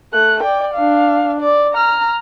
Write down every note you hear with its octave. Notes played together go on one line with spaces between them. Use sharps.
A3 F#6
D5 G5
D4 F5
D5
A#5 F6